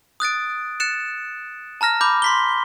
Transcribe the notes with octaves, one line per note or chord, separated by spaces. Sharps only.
D#6 F#6 A6 D7
F#6 A6 C#7 E7
A5 A#5 F6 A#6
B5 D6 G6
C6 B6 G7